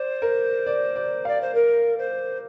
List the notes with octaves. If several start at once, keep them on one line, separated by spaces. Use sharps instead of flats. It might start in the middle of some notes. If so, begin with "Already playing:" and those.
Already playing: C5 D5
A#4
D5
D5
D5 F5
C5
A#4
C5